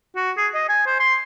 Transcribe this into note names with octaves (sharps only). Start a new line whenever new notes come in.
F#4
G#4
D#5
G#5
C5
C6